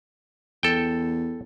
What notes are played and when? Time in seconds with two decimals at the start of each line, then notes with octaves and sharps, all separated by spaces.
0.63 E2 A4 G5